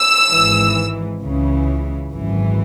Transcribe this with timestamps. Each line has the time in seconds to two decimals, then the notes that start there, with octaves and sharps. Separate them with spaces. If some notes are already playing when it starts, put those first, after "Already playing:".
Already playing: E6
0.29 G#1 G#2 E3
1.22 C#2 C#3 E3
2.13 G#1 F#2 E3